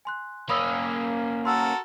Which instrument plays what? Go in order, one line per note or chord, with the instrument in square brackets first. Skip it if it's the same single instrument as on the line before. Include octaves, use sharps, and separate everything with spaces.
[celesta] G#5 C6 F#6
[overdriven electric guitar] A#3 C#4 [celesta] B5 D#6 E6
[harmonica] F#4 A4 A#4 [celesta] C6 E6